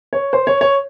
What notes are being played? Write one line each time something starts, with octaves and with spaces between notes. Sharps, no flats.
C#5
C5
C#5
C#5